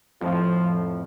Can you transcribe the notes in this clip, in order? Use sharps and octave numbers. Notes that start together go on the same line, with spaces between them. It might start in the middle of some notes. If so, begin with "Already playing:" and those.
F2 A2 F3